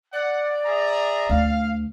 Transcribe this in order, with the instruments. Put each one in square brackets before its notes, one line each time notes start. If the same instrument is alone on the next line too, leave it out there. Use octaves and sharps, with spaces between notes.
[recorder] D5 [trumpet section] F#5
[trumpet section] G#4 E5 A#5
[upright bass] D2 [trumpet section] F5